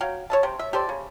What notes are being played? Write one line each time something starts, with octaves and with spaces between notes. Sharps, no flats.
F#3 F5 G5
C#5 E5 A5
C3 G5
E5
G4 A4 C5 D5
C#3